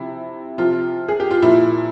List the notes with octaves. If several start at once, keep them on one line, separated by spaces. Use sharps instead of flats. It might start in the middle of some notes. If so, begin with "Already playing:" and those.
Already playing: C3 F3 E4
C3 F3 F4
G#4
G4
F4
A#2 F3 E4